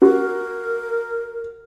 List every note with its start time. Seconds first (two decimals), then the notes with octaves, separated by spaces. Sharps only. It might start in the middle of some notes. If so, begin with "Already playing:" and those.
0.02 F#4 A#4